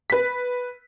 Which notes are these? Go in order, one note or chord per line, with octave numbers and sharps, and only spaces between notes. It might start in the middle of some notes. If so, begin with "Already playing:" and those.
B4 B6